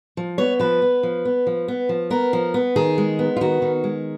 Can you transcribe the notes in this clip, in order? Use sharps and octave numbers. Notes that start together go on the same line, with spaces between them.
F3
B3 C#5
F3 B4
B3
F3
B3
F3
B3
F3
B3 A#4
F3
B3
D#3 G#4
G#3
B3
F4
D#3 F#4
D#3
G#3